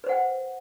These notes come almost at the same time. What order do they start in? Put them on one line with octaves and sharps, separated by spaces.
B4 C5 F#5 G5